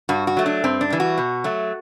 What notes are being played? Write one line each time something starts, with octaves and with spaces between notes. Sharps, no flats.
G2 F#4
F#4
F#3 A3
D4
G2 C4
D4
E3 G3
F#4
B2
F#3 A3